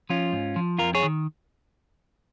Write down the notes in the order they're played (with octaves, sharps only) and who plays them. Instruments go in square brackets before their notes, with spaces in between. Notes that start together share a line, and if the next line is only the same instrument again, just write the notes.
[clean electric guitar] F3 C#4 F4
G#2
F3
F2 F4 A#4
G#4 C#5
D#3